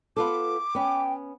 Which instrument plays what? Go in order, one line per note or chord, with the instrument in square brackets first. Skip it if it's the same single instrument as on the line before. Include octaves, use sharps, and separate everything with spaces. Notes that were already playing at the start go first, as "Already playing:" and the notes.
[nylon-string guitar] B3 F4 A4 [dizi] D6
[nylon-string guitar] B3 C#4 [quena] G5